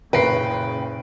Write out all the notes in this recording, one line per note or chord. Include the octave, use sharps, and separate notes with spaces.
F#1 A#2 C#3 A#4 B4 G5 C7